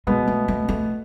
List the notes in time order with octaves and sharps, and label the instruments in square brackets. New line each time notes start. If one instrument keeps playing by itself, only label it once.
[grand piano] B2 B3 [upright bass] G#3
[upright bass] A3
A3
A3